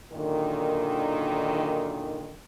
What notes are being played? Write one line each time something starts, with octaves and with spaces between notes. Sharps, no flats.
F#2 A#2 D3 D#3